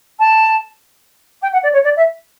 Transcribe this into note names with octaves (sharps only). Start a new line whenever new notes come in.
A5
G5
F#5
D5
C#5
D5
E5